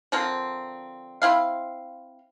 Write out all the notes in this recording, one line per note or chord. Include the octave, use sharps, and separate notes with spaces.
D3 F3 A#3 C4
C4 E4 F5